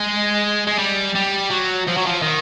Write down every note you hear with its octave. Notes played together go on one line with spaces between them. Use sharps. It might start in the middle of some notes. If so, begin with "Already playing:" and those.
Already playing: G#3
G#3
G3
G3
F#3
F3
F#3
F3
D#3